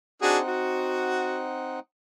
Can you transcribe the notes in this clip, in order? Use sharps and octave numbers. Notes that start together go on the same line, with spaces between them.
C4 D4 D#4 F#4 G#4 F#5
F#4